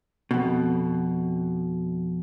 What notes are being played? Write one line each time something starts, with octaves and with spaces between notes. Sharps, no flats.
F2 B2